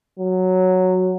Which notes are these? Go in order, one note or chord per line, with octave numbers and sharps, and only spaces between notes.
F#3